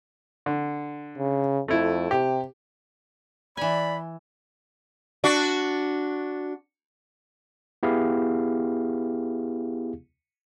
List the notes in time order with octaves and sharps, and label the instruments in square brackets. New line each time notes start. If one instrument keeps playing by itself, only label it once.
[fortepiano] D3
[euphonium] C#3
[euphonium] F2 [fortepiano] A3 E4
[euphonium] C3 [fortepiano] G4
[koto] E3 G#5 [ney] D5 [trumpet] B5
[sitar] D4 F#4
[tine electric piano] B3 E4 G4 G#4 F5